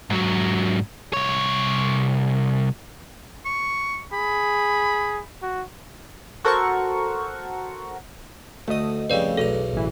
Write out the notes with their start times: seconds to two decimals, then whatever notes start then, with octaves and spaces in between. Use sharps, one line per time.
0.10 G#2 F#3
1.13 C2 C#5
3.45 C#6
4.13 G#4 B5
5.42 F#4
6.44 F#4 A4 A#4 C5 F#5 C#6
8.68 D2 A3 D#5 D#6
9.10 F2 C#3 G3 B4 D5
9.37 B1 E2 A4 A#5
9.73 A1 E3